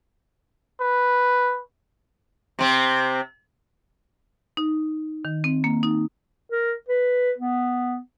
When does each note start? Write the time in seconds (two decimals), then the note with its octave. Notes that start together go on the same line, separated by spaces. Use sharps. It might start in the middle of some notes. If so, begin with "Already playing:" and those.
0.81 B4
2.59 C3 C4
4.57 D#4
5.25 D#3
5.44 C4
5.64 A#3
5.83 D#4
6.51 A#4
6.89 B4
7.38 B3